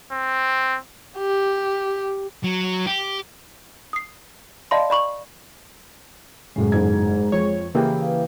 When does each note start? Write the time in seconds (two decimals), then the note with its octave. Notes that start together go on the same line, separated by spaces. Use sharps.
0.12 C4
1.18 G4
2.44 F#3
2.87 G4
3.93 D#6 C7
4.71 D5 D#5 F5 A5 B5 C6
4.90 D5 B5 C#6 F#7
6.56 F#2 A2 C#3 G#3 G#4
6.72 F#1 G#2 G#6
7.32 F2 C#5
7.75 C#3 E3 A#3 G4 G#4 G5
8.01 B4 F5